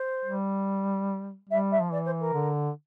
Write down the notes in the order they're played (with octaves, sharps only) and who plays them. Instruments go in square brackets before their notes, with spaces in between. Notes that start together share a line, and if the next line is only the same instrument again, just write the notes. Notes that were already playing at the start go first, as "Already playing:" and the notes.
Already playing: [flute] C5
[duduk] G3
[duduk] G3 [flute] E5
[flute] E5
[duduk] F3
[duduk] E3 [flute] D5
[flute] C5
A#4
[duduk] D3